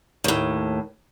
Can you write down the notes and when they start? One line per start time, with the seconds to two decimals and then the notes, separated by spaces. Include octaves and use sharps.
0.24 D#2 A2